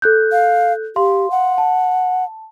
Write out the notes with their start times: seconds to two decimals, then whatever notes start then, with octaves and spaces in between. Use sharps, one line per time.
0.02 A4 F#6 G6
0.32 F5
0.96 G4 F5 C6
1.31 F#5
1.58 A5